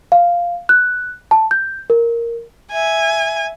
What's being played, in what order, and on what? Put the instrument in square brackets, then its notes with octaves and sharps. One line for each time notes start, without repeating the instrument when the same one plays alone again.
[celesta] F5
F#6
A5
G6
A#4
[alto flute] E5 [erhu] G#5